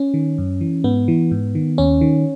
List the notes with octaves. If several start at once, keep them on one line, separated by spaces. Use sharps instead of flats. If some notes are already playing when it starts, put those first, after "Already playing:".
Already playing: C#4
D#3
F#2
E3
G#2 B3
E3
G#2
D#3
D#2 C#4
D#3